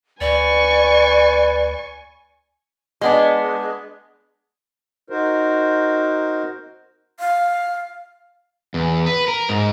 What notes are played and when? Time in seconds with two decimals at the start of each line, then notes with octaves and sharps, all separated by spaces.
0.21 D2 B4 D5 G#5 C#6
3.01 G#3 B3 D4
5.10 D#4 F#4 A#4 C5
7.19 F5
8.74 E2
9.06 B4
9.28 A#4
9.49 G#2